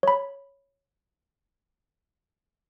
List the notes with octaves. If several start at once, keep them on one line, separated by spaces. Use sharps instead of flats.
C#5 B5